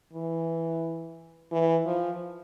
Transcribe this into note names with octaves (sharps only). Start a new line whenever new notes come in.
E3
E3
F3